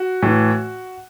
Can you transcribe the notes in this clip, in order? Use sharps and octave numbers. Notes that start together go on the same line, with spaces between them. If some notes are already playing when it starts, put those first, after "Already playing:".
Already playing: F#4
A2 E3